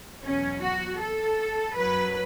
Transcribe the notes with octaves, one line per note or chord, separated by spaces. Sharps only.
E2 B2 F#3 C#4
F#4
A4
F#2 F#3 B4